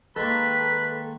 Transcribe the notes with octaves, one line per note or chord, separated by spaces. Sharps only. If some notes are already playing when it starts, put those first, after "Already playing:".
D#3 G#3 A#3 A4 B4 B5